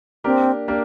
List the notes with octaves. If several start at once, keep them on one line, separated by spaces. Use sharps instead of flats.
A#3 C4 D4 G4 A#4
A#3 D4 G4 A#4